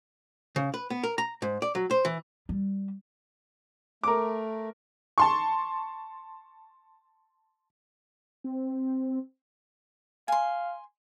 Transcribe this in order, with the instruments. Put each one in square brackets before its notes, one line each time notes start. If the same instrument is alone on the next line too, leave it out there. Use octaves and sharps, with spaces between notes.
[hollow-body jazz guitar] C#3
B4
B3
A#4
A#5
G#2
D5
F#3
C5
E3
[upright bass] G3
[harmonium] A3 [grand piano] A#4 D6
[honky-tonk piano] A5 C6 C#6
[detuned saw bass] C4
[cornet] F5 [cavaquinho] G#5 C6